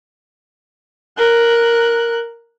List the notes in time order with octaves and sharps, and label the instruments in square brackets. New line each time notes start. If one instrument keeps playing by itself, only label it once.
[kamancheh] A#4 F#6